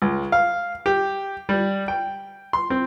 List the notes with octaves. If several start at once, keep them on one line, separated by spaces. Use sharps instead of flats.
C#2
F5
G4
G3
G5
C6
C4